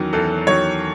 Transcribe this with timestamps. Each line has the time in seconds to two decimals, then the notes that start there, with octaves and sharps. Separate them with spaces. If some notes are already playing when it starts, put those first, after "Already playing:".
Already playing: E2 D#3 F#3 C#4
0.13 E2 A4
0.47 D#3 F#3 C#5